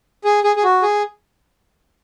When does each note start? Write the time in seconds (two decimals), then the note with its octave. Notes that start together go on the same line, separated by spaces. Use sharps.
0.24 G#4
0.44 G#4
0.56 G#4
0.63 F#4
0.82 G#4